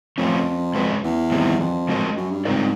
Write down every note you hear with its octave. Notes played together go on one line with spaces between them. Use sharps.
F2 F3 A3 C#4
G#3 C#4 F#4 B4
E2
D#3 G3 C4
F2
G#3 C#4 F#4 A#4 D#5
F#2
G2
G#2 G3 C4 F4 A#4 D5